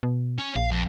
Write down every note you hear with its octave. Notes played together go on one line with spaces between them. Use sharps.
B2
C#4
A#1 F5
F2